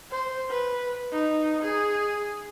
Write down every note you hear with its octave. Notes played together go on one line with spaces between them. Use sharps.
C5
B4
D#4
G#4